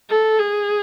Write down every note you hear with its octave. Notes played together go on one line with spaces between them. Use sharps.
A4
G#4